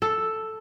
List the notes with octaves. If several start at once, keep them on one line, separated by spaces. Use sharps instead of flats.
A4